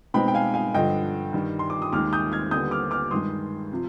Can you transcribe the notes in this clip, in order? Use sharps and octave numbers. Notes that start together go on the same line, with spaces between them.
B2 G#3 C4 D#4 G5 B5
G5
F5 G#5
F5 G#5
G2 D3 F3 D#5 G5
G2 D#3 G3
C6
D6
D#6
D#2 D#3 G#3 D6 F6
D#6 G6
F6 G#6
D#2 D3 G3 B3 D#6 G6
D6 F6
D6 F6
G2 D#3 G#3 C6 D#6
C3 F3